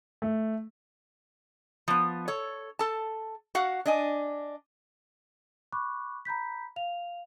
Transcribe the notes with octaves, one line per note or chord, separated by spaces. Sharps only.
A3
F3 B3
A4 C#5
A4 A5
F#4 F5 F#5
D4 D#5 G#5
B5 C#6 D6 F#6
A#5 B5 G6 B6
F5 F7